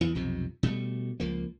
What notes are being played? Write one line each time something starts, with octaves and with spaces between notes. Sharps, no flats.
E2 E3
B1 F2 C3
B2 G3 A3
C#2 F3 A#3